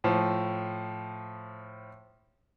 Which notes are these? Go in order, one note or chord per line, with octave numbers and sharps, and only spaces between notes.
A2 F3